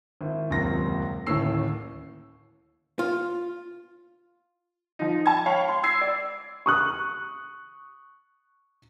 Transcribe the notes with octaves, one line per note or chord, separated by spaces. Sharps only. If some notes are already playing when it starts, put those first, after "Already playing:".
G#1 E4
D#1 C#2 F#2 C3 C6 A#6
D1 D#2 A2 C#4 E6 C7
F4
F3 D#4
A5 G#6
C#5 F5 G5 B5
C6
E6 G#6 C7
D5
C#6 D#6 F#6